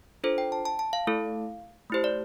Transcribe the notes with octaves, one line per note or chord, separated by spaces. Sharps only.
D4 F4 A4 C5
G5
A5
A5
A5
F5
A3 E4 A4
A3 E4 G4 C5
D5